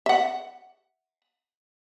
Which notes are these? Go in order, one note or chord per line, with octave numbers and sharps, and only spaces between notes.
E5 F#5